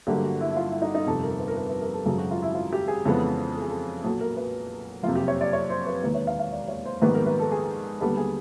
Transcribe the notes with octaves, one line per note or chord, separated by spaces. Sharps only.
G1 G2 D3 F#3 A#3 G4
F#4
E4
E4
F4
E4
D#4
D#4
G1 F2 C3 A4
A#4
B4
A#4
B4
B4
A#4
A4
G#1 F#2 C#3 F#3 A4
F#4
F4
E4
F4
G4
G#4
F2 C#3 E3 G#3 B3 A4
A4
G#4
A4
B1 A#2 F#3 A4
A#4
B4
F#1 F2 C3 F4
G4
C#5
D5
C#5
C5
B4
E1 D#2 D#3 B4
C#5
F5
F5
D5
C#5
C5
A#1 G#2 D#3 G3 B3 B4
A#4
B4
A4
G#4
D#2 D3 G3 B3 A4
G#4